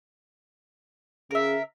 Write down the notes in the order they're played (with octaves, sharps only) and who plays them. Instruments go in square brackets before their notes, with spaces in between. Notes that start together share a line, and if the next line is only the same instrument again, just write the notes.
[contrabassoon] C#3 [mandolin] A#4 E5